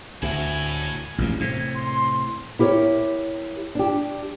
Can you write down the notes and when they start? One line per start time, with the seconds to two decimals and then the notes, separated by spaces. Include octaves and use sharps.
0.23 D2 A2 E4 G#5
1.18 A1 E2 A#2
1.40 A2 C3 G#6
1.74 C6
2.59 E4 G4 A#4 B4 C#5
3.75 D4 G4